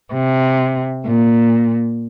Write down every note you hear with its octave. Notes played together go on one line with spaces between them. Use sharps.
C3
A#2